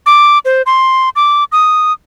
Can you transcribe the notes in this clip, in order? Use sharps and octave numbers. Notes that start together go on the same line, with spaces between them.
D6
C5
C6
D6
D#6